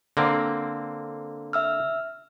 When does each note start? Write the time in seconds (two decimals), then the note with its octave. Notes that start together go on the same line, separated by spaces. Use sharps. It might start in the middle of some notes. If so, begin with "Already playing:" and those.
0.17 D3 A#3 C4
1.53 E5 E6 F6